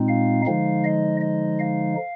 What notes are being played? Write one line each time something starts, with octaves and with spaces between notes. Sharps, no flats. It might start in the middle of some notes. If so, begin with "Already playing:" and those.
Already playing: A#2 G#3 C4 D#4
F5
D3 F3 G#3 D#4 F5
D#5
D#5
F5